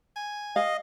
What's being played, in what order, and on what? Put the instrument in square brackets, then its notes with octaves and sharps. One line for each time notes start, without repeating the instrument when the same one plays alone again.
[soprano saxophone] G#5
[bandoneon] D#5 [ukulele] F5